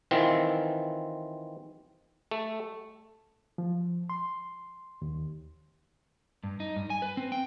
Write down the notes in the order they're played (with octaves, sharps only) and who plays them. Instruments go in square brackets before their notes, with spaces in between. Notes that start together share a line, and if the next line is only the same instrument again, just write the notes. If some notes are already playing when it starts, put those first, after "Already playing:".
[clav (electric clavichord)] D#3 E3 C4 F4
A3
[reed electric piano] F3
C6
D#2
[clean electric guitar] G2
D#4
G2
G#5
B4
C4
G5